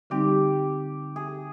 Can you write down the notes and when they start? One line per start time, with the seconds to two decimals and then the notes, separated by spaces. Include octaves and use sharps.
0.10 D3 G3 C4 D#4 G4
1.16 G#4